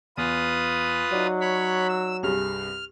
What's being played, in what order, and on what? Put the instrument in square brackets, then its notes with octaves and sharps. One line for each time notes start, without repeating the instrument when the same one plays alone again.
[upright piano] E2 [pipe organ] F4 B4 D#6
[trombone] F#3 [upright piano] D#4 D5
[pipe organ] C#5 B5
E6
[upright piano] C2 G2 G#4 [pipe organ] F6